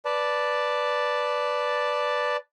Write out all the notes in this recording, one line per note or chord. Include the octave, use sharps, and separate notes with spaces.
B4 D5 A5